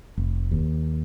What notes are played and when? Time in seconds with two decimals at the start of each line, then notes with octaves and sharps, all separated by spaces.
0.17 F1
0.51 D#2